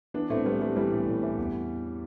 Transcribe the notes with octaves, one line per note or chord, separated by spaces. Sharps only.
E3 B3 D4
A2 A3 C4
E3 G3 B3
E3 G3
E3 G3
A2
A2
E3
E2